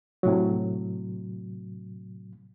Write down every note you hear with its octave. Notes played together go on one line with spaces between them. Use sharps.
A2 C3 F#3